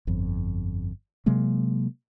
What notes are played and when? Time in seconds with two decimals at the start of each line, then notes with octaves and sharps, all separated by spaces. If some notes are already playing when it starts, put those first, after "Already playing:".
0.07 G1 F2
1.26 C3 F#3 G#3 A#3